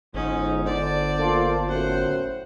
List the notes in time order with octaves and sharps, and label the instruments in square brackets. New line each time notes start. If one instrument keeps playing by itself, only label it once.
[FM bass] G1 [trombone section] G#2 [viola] C#4 D#4
[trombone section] D3 [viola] C5 D5
[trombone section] A#3 F4 A4
[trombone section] F#2 A2 [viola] C5 F#5